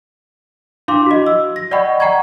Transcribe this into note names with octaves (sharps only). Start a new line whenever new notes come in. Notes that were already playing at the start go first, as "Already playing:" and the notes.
D4 E4 F5 C6 D6
F#4 D#5
E6
A#6
D5 D#5 F#5 G5 B5 C#6
F#5 G5 A#5 C#6 G#6